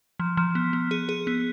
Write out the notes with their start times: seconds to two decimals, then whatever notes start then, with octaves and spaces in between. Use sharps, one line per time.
0.20 F3
0.37 F3
0.55 B3
0.73 B3
0.91 G#4
1.09 G#4
1.27 B3